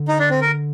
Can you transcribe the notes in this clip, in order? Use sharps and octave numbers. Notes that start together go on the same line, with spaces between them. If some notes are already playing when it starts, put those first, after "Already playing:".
Already playing: D3
D#4
D4
C4
A#4